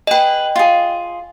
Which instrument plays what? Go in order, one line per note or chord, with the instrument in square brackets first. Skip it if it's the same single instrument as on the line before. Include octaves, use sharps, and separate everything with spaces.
[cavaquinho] G#4 B4 [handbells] D#5 G5
[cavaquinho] F4 G#4